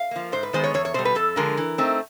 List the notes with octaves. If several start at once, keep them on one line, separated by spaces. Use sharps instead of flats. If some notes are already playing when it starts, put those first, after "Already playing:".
Already playing: F5
F3 A#3
G#2 C5
B4
D#3 G#3 B3 C5
C#5
E2 C#5
C#5
B2 G3 C5
B4
F2 A4
D3 F3 G#3 A#4
E3
A3 C4 D#4